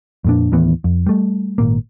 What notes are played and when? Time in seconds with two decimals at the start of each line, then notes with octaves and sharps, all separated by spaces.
0.24 F2 A#2 D4
0.52 D#2 A2 E3 B3
0.84 F2
1.07 G3 A3
1.58 G#1 A#2 A#3